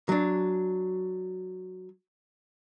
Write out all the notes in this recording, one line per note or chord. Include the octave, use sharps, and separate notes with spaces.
F#3 D4